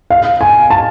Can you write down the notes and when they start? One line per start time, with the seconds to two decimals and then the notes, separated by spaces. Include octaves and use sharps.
0.10 F5
0.41 G#5
0.70 A5